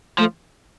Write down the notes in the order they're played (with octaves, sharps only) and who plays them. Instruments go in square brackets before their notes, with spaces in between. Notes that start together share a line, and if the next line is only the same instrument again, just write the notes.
[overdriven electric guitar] F3 [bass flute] A3